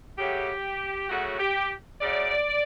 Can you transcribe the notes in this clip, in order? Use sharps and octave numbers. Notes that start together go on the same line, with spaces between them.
C#3 F#3 A3 G4
C#3 F#3 A3 F#4
G4
C#3 F#3 A3 D5